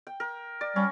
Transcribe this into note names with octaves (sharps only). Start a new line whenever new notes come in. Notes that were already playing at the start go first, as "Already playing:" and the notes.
G5
A#4
D5
G3 C#4